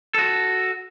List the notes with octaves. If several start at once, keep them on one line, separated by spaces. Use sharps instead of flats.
F#4 A4